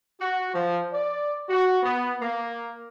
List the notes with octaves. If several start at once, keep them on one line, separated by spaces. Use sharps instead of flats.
F#4
F3
D5
F#4
B3
A#3